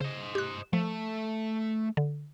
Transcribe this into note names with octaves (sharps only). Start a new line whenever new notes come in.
C#3 C5 D#5
G4 F#6
F3 A3
D3